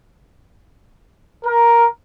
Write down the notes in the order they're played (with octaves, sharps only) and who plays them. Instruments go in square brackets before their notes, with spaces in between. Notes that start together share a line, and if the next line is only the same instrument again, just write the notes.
[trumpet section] A#4